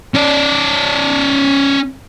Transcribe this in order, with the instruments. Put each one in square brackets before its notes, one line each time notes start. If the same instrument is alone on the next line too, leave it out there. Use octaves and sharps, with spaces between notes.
[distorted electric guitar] C#4 D5